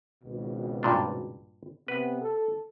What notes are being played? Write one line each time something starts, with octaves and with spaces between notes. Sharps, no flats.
G#1 C#2 B2
G2 A#2 D4
C3 B3 B4
A4